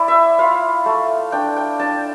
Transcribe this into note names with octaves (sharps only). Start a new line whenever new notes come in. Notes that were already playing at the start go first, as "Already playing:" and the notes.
Already playing: E4 D5
E5
F4 F5
A3
D4 G5
G5
D4 A5